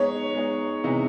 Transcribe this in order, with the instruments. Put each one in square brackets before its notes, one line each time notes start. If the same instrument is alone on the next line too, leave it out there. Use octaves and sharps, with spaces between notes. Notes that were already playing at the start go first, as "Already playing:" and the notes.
Already playing: [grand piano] G#3 B3 D#4 [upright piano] C#5
[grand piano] G#3 B3 D#4
C3 E3 G#3 B3 D#4